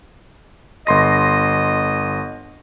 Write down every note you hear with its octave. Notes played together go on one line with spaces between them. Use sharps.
G1 D#5 C6 A#6